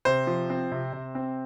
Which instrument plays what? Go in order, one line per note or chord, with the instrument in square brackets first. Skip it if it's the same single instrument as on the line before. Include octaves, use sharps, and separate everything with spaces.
[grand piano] C3 C5
F3
C4
C3
C3
C4